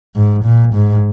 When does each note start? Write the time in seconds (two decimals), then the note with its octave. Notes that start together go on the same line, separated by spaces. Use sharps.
0.16 G#2
0.44 A#2
0.74 G#2